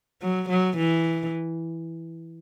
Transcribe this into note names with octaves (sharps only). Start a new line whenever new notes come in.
F#3
F#3
E3